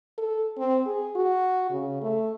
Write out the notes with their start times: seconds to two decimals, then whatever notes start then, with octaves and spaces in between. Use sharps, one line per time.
0.18 A4
0.58 C4
0.86 G#4
1.16 F#4
1.70 C#3
2.02 A3